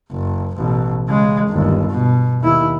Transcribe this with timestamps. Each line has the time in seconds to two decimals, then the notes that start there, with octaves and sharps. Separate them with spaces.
0.11 F#1
0.56 A1 B2
1.08 C#3 G#3
1.48 G1 D#2
1.90 B2
2.40 D#2 E4